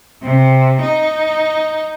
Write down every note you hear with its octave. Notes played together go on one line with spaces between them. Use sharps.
C3
D#4